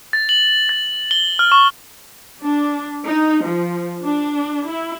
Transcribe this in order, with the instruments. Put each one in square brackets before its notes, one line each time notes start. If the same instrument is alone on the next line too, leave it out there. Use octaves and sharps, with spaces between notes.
[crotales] A6
F#7
A6
G7
F6
C#6
[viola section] D4
D#4
F3
D4
E4